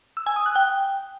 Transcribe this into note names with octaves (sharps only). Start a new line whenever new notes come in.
E6
G#5
D#6
F#6
G5